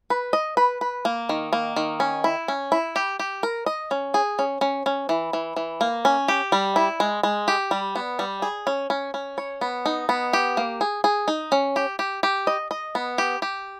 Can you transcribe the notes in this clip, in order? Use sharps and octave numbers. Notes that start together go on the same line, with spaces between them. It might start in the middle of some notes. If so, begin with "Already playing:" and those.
B4
D#5
B4
B4
A#3
D#3
A#3
D#3
C#4
E4
C#4
E4
G4
G4
A#4
D#5
C#4
G#4
C#4
C#4
C#4
E3
E3
E3
A#3
C#4
G4
G3
E4
G#3
G#3
G4
G3
B3
G3
G#4
C#4
C#4
C#4
C#5
B3
D#4
B3
G4
A#3
G#4
G#4
D#4
C#4
G4
G4
G4
D#5
D#5
B3
G4
G4